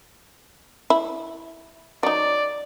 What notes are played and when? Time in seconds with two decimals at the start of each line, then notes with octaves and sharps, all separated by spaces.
0.90 E4
2.03 F#3 D#4 D5